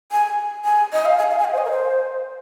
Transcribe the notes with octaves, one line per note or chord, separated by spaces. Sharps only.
G#5
G#5
D#5
F5
G#5
F5
G#5
F5
C5
D#5
A#4
C5